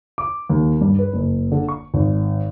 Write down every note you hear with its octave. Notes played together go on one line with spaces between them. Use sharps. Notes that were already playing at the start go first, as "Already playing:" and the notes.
D6
D#2
G2
B4
F#1
D3
C#6
G#1